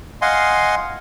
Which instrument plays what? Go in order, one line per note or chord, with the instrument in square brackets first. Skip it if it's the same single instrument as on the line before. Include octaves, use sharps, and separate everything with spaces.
[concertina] D#5 F5 F#5 G#5 C6